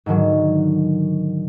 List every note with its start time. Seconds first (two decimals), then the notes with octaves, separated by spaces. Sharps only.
0.06 G#2 D3 D#3 F#3